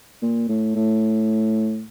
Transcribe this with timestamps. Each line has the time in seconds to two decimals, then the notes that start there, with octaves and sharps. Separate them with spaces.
0.22 A#2
0.48 A2
0.75 A2